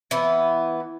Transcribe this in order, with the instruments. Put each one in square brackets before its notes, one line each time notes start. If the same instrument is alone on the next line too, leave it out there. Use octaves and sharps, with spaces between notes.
[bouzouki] E3 B3